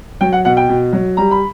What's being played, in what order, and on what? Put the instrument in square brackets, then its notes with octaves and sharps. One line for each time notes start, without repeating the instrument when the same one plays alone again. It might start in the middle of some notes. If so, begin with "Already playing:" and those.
[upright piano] F#3 G5
F#5
B2 F#5
G5
B2
F#3
G3 A#5
B5